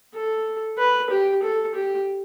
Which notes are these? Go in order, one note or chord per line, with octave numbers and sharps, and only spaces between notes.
A4
B4
G4
A4
G4